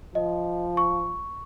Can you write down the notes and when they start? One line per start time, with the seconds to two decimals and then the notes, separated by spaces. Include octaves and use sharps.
0.15 F3 D#5
0.77 C#6